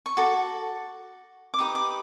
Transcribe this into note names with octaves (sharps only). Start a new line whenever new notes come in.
C#6
F#4 A4 D6
D6
D#4 G4 B4 D#6
D6